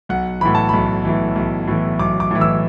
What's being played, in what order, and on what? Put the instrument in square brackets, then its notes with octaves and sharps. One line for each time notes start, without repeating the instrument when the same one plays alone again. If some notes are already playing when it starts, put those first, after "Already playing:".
[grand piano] B1 F#5
A2 E3 B5
A5
B1 B5
A2 E3
B1
A2 E3
B1 D6
D6
A2 E3
E6